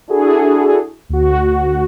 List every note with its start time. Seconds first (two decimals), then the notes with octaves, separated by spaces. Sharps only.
0.08 D4 E4 F#4 G#4 A4
1.09 D2 F#4